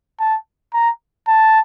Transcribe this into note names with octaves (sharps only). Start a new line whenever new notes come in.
A5
A#5
A5